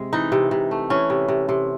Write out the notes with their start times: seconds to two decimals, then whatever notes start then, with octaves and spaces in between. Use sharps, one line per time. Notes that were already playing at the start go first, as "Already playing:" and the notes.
Already playing: C3 G#3
0.13 E3 D#4
0.32 C3
0.51 C3
0.71 A3
0.90 E3 C#4
1.10 C3
1.28 C3
1.49 C3